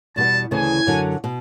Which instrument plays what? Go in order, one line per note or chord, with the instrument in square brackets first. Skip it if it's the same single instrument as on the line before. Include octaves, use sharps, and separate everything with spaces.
[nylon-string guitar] E2 B2 G3 B3 [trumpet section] A5
[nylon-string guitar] D2 C#3 E3 [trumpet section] G#5
[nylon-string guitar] F#2 D3 F#3
B2